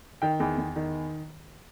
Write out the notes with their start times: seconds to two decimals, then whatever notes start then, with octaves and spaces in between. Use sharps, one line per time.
0.22 D#3 G5
0.40 E2
0.58 E2
0.76 D#3